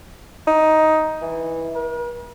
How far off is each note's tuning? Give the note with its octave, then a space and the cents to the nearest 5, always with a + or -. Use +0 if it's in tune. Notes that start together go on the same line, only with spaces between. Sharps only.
D#4 +10
E3 -10
A#4 +45